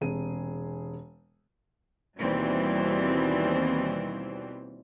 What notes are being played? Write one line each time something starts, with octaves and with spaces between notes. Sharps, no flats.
E1 C3 G#4 D#7
D#2 B2 E3 G3 C4